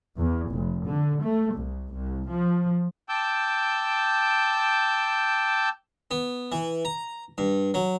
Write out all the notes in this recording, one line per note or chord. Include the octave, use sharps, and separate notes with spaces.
E2
F1
D3
A3
C2
C2
F3
G5 A5 D6 E6 G6
B3
E3
A#5
G2
F#3